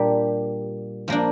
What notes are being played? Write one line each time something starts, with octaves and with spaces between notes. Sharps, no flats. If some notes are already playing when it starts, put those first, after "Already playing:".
Already playing: A#2 G3 A#3 D4 G4
F3 A#3 D4